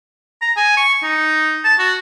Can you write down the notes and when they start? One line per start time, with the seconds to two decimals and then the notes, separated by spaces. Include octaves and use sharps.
0.42 A#5
0.57 G#5
0.77 C#6
1.03 D#4
1.65 A5
1.79 F#4